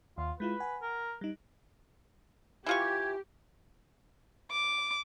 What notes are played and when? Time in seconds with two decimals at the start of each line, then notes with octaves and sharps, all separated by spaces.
0.18 D#2 F4
0.40 G#3 E4 F4 B4
0.60 F#5 G#5
0.82 A#4
1.21 G3 D#4
2.66 E3 F4 G4 C#6 G#6
4.51 D6